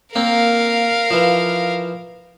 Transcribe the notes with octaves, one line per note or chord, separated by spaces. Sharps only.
A#3 C4 A#4 F5
E3 F3